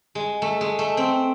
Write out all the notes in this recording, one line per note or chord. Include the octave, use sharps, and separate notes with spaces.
G#3
A3
G#3
A3
C4